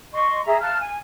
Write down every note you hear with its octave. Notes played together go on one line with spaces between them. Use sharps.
D#5 C6 C#6
G#4 E5 A#5
F5 A5 F6 F#6
G#5